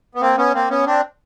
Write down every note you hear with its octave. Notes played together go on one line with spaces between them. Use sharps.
B3
A#3 C4
B3 C#4
A#3 C4
B3 C#4
C4 D4